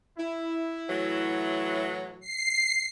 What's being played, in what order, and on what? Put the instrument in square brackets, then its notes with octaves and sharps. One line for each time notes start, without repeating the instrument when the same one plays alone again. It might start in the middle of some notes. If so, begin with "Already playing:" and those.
[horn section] E4
[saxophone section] A2 E3 F#3
[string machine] C7